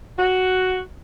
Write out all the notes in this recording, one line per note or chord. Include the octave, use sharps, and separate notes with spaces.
F#4